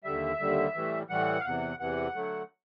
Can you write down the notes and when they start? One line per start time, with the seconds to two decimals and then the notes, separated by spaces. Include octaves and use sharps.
0.04 D#2 D3 G3 E5
0.40 D#2 D3 G3
0.74 A2 E3 G3
1.10 A2 E3 G3 F#5
1.40 F5
1.45 E2 C3 E3 F#5
1.80 E2 C3 E3 F#5
2.15 D3 F#3 A3